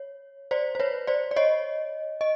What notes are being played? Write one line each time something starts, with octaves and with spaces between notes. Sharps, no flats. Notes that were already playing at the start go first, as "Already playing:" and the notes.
Already playing: C#5
C5 D5
C5
B4 C#5
C5 D5
D5
C#5 D#5
D#5